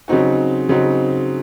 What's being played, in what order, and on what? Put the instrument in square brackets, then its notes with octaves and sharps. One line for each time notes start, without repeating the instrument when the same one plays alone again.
[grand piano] C#3 F#3 C4 D#4 F#4
C#3 F#3 C4 D#4 F#4